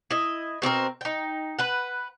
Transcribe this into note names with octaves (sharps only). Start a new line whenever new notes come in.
E4 D#5
B2 C4 G4 A#4
D#4 G5
B4 F#5